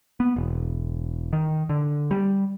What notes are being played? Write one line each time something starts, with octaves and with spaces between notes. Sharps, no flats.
B3
E1
D#3
D3
G3